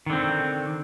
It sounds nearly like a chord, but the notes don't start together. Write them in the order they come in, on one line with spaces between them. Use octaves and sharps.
D#3 D3 C4